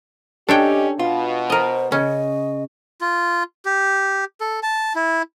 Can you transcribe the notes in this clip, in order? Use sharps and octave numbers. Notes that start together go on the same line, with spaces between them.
D3 C#4 D4 G4 A4 C#5 D#5 G5
B2 F4 F5
A#4 C5 D#5
C#3 C#4 D#5
F4
G4
A4
A5
E4